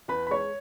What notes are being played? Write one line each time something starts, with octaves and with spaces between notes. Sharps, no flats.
E2 B4 B5
B5
G#3 C#5 C#6